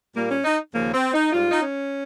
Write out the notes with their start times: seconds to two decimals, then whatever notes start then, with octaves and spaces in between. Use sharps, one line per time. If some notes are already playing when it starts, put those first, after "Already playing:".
0.16 A#2 G3 A#3
0.31 C#4
0.45 D#4
0.74 D#2 C#3 F3 A#3
0.94 C4
1.13 D#4
1.32 G#2 G3 F4
1.51 D#4
1.62 C#4